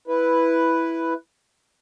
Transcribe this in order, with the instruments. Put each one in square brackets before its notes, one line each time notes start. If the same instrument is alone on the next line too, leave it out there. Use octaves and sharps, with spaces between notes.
[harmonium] E4 B4